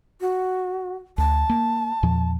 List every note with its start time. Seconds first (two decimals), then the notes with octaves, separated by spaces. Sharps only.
0.21 F#4
1.18 D2 A5
1.49 A#3
2.03 E2 A#2 F3